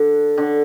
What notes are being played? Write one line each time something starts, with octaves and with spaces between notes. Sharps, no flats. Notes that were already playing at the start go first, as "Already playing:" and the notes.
Already playing: D3
D3